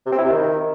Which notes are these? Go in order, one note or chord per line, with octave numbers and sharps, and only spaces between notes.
C3
C4
E4
C3
D#3